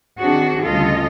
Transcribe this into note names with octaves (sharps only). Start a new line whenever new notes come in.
D#3 C4 D4 F#4 G#4
D2 C#3 G3 F4 A4 D#5